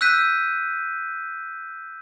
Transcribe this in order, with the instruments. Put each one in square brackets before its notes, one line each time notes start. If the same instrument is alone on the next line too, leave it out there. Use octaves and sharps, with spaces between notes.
[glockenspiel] E6 F#6 G6 B6 D#7